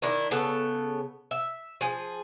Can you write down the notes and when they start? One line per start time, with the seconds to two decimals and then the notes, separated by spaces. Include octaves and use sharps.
0.02 D#3 D4 E4
0.31 C#3 B3 A4
1.31 E5
1.81 F3 G#4